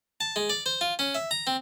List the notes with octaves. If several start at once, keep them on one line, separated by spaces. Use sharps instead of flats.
A5
G#3
D5
C5
F4
C#4
E5
A#5
C4